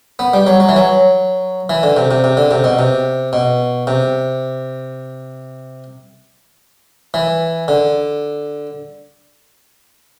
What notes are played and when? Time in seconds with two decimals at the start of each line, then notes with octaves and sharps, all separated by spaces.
0.19 B3
0.34 G3
0.47 F#3
0.60 F#3
0.69 E3
0.76 F#3
1.70 E3
1.83 D3
1.97 C3
2.11 C3
2.24 C3
2.37 D3
2.51 C3
2.64 B2
2.79 C3
3.33 B2
3.87 C3
7.14 E3
7.68 D3